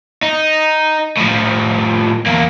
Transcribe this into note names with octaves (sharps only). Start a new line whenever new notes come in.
D#4
A2 F3
E2 A#3